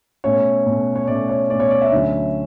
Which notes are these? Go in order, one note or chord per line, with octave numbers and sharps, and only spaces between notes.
B2 A3 C#4 C#5
B2 A3 C#4
C#5
B2 A3 C#4 D5
C#5
B2 A3 C#4 D5
C#5
D5
E5
D2 D3 F#3 C#4